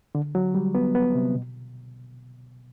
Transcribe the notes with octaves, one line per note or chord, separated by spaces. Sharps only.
D3
F#3
G3
B3
B3
C3
B2